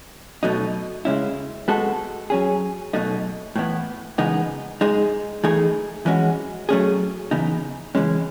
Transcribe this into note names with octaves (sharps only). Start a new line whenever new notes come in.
B2 F#3 A3 D#4
C#3 G#3 C#4 E4
G#3 B3 F#4 A4
F#3 C#4 G#4
B2 F#3 A3 D#4
A2 E3 B3
C#3 E3 G#3 B3 D#4
G#3 D#4 G#4
E3 A3 D#4 G#4
E3 G#3 C#4 F#4
F#3 A3 C#4 G#4
C#3 E3 B3 D#4
C#3 E3 G#3 C#4